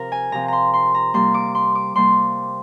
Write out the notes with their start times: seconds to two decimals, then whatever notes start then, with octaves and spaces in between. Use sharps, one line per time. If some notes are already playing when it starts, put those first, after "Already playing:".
Already playing: C3 F3 C4 A#4
0.12 G#5
0.32 C3 F3 C4 A#5
0.48 A#5 C6
0.74 C6
0.95 A#5
1.14 C3 G3 A#3 C6
1.34 D6
1.55 C6
1.75 D6
1.96 C3 G3 A#3 C6